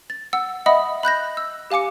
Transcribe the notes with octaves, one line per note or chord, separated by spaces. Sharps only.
A6
F#5 E6
D#5 E5 F#5 B5 D#6
B5 F#6 G6 A#6
E6
G4 F5 G#5 D6 C#7